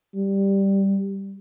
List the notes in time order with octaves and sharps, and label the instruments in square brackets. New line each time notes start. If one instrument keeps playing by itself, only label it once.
[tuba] G3